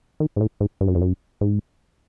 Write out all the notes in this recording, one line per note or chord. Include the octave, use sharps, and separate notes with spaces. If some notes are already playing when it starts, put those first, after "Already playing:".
D#3
G#2
A2
G#2
G2
F#2
F2
F#2
G#2